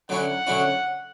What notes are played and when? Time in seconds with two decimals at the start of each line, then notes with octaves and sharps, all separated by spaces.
0.09 D3 F#3 C#4 E4 F#5
0.47 D3 F#3 C#4 E4